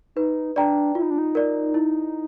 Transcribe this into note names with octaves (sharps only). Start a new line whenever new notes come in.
D#4 B4
D4 D5 G5 A#5
E4 F4
D#4
D4
D#4
A#4 D5
E4